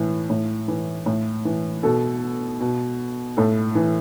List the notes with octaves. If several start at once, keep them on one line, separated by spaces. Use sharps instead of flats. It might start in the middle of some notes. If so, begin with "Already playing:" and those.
Already playing: A2 E3
A2
E3
A2
E3
B2 A4
B2
A2 A4
E3